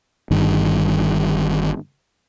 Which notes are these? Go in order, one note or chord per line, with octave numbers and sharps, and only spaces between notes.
G1 G2 D#3